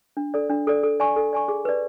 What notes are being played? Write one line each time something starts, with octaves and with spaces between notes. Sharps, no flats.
D4
A4 D5
D4
A4 D5
A4
D5 G#5 C#6
A4
D5 G#5 C#6
G#4
B4 D5